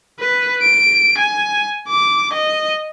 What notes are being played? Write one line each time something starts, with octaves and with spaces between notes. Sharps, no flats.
B4
D7
G#5
D6
D#5